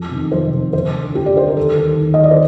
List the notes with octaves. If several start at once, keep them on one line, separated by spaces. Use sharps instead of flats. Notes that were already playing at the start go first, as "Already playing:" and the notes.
Already playing: F2
C3 D#3
F2 C5
C3 D#3
D2 C5
D3
D2 G4
D5
D3 C5
A#4
D#2 A4
D#3
D#2
D#5
D#3 D5
C5